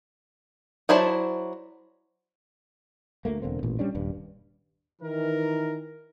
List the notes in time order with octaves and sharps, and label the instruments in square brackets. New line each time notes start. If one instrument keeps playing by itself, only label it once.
[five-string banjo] F#3 E4 C5 D5 A5
[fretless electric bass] D2 A3 A#3
E1 D3 A#3 C4
A1 A#2
G3 C#4 D4
D#1 G2
[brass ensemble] D#3 E3 A#4